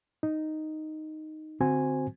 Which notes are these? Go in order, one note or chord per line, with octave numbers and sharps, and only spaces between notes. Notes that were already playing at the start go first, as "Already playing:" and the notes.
D#4
D3 C4 F#4 C5 G#5